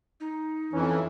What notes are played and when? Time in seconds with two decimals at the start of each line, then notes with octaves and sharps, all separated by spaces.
0.20 D#4
0.73 F2 E3 C#4